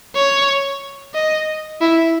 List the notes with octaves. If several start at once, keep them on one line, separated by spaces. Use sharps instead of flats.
C#5
D#5
E4